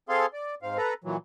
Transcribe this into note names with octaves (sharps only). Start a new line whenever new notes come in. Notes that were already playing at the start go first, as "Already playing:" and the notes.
C4 G#4 A4 F5 C6
D5
G#2 C4 F5
A4 B4 A#5
A#2 E3 F#3